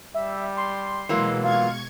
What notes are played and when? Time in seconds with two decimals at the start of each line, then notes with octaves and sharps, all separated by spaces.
0.14 G3 E5
0.57 C6
1.09 B2 E3 F#3 G#3 A#3
1.44 F4 F5 C#6 G#6